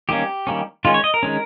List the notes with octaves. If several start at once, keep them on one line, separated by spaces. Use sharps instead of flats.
D#3 G3 A#3 C#4 G4
D#3 G3 A#3 C#4
D#3 G#3 C#4 F4
C#5
D#5
A#4
D#3 G#3 C#4